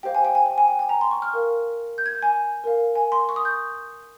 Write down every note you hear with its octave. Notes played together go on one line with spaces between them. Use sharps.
G4 C5 F5 G5
G#5
G5
G#5
G#5
G#5
G5
G#5
A#5
C6
C#6
F6
A#4 F5
G6
G#6
G6
G#5
A#4 F5
G#5
C6
C#6
D#6
G6